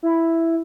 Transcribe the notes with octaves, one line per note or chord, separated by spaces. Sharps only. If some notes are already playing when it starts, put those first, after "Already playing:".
E4